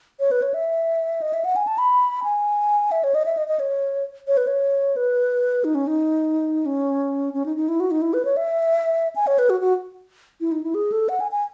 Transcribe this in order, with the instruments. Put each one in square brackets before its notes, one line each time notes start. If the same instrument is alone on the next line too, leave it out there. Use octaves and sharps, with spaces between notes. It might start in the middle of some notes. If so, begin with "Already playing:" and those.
[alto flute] C#5
B4
C#5
E5
D#5
E5
F#5
G#5
A5
B5
G#5
E5
C#5
D#5
E5
D#5
D#5
C#5
C#5
B4
C#5
B4
D#4
C#4
D#4
C#4
C#4
D#4
D#4
E4
F#4
D#4
E4
B4
C#5
E5
G#5
C#5
B4
F#4
F#4
E4
D#4
E4
G#4
A4
F#5
G#5
G#5